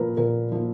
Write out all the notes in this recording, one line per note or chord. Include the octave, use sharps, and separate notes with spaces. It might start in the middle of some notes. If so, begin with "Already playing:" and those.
Already playing: A#2 F3 A#3 A#4 B4
A#2 A#4
F3 A#3